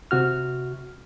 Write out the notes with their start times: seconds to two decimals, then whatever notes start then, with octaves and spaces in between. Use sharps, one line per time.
0.11 C3 F#4 F6